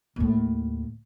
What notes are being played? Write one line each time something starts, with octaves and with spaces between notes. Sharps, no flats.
D#2 A2